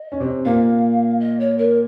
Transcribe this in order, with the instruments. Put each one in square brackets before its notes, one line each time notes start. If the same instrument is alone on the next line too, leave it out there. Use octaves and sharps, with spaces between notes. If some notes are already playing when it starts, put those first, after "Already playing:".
Already playing: [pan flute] D#5
[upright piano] C#4
C3 C4
[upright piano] A#2 A#3 [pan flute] F5
[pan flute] D#5
C#5
A#4